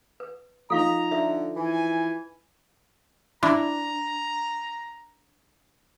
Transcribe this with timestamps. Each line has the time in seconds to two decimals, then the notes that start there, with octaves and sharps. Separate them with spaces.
0.20 B4
0.70 F3 D#4 A4 F5 A#5 C#6
1.11 D3 E5
1.56 E3 G#5
3.43 D4 E4 A#5